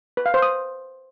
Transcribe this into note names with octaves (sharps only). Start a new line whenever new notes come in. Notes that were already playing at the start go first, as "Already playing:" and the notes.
B4
F5
C5
D#6